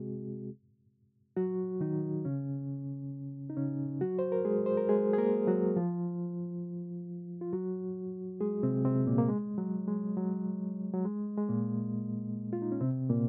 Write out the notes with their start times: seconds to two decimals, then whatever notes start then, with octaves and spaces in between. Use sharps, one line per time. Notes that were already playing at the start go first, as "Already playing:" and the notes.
Already playing: C3 G#3 C4 F#4 G#4
1.37 F#3 F#4
1.81 D#3 D#4
2.25 C#3 C#4
3.50 D#4
3.57 C#3 C#4
4.01 F#3 F#4
4.19 C5
4.32 A#4
4.45 G#3 G#4
4.66 C5
4.77 A#4
4.89 G#3 G#4
5.13 G#4
5.18 A#3 A#4
5.48 F#3 F#4
5.76 F3 F4
7.41 F4
7.53 F#3 F#4
8.41 G#3 G#4
8.63 C3 C4
8.85 C3 C4
9.07 A#2 A#3
9.18 A#3
9.28 G#3
9.58 F#3
9.88 G#3
10.17 F#3
10.93 F#3
11.04 G#3
11.38 G#3
11.49 A#2 A#3
12.53 F4
12.62 D#4
12.72 C#4
12.81 C3 C4
13.09 A#2 A#3